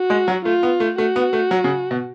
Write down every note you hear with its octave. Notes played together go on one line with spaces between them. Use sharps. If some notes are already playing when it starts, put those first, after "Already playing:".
Already playing: F#4
G#3
F#3
A3 F4
B3
A3
A3 F#4
B3
A3
F#3
C#3
B2